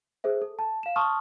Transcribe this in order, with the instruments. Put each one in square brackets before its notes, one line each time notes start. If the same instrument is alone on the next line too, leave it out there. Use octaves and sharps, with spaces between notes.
[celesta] G#4 A4 C5 E5
A4
A5
F5 E7
A5 C6 C#6 D#6 F6